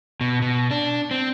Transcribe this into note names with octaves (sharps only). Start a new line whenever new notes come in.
B2
B2
D4
C4